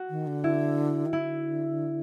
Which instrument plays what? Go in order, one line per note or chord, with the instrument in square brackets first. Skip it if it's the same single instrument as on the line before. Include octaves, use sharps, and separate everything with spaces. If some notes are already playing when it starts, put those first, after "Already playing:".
Already playing: [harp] F#4
[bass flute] D#3
D3
[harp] E4
[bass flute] D#3
[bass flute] D3 [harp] E4